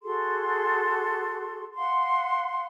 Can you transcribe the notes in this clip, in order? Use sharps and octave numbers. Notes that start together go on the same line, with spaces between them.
F#4 G#4 A4 C6
F5 F#5 C6